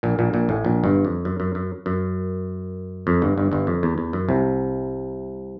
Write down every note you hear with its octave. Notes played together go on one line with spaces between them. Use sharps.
A#1 A#2
A#1 A#2
A#1 A#2
A1 A2
A#1 A#2
G1 G2
F2
F#2
F#2
F#2
F#2
F2
G1 G2
G1 G2
G1 G2
F2
E2
E2
F#2
C2 C3